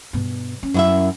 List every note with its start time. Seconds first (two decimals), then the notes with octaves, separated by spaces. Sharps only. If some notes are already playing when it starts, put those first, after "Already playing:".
0.13 G2 B2
0.63 C#4
0.74 F#2 E4 E5